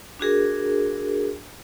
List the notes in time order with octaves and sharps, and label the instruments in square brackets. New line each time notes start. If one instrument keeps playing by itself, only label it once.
[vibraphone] D4 F#4 G#4 A#4